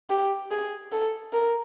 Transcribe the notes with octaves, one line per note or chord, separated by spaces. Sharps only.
G4
G#4
A4
A#4